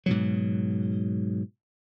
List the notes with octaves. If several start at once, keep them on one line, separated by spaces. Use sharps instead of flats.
G#2 B2 F#3